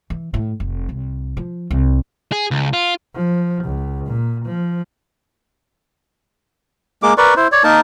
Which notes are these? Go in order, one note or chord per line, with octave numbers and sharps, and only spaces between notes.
E3
A2
F1
C2
F3
C2
G#4
C#2
F4
F3
C#2
A#2
F3
G#3 A#3 D6
A#4 B4 D5 C#6
E4 C5
C#5 D5
A#3 D#4 A#4 A5